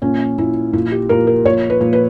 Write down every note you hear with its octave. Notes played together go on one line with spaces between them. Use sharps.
A#2 C#4
A#2 E4
A#2 E4
G4
A#2 A#4
A#4
A#2 C#5
B4
A#2
B4